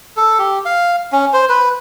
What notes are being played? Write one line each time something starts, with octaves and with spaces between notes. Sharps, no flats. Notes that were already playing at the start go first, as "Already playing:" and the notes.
A4
G4
F5
C#4
C5
B4